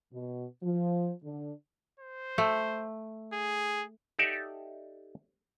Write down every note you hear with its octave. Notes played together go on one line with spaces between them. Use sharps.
B2
F3
D3
C5
A3
G#4
D#4 G4 A4 D5 E5 F#5